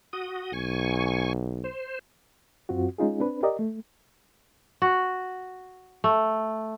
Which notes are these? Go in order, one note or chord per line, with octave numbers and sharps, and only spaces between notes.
F#4 D#6
B1 G#5 C#6
C5
F#2 C4 F4 F#4
G#3 C#4 D#4 F4 G#4
C4 D4 B4
G4 A#4 D5 D#5
A3
F#4
A3